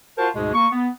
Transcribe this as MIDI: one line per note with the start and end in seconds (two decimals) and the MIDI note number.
0.18 0.28 65
0.18 0.28 66
0.18 0.28 70
0.18 0.28 72
0.18 0.28 81
0.35 0.49 38
0.35 0.49 44
0.35 0.49 47
0.35 0.49 56
0.35 0.49 68
0.54 0.67 58
0.54 0.67 85
0.72 0.87 59